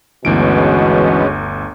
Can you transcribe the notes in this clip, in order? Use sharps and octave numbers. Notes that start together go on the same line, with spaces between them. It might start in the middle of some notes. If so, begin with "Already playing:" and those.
G1 D2 B2 E3 G#3 B3 C#4 D7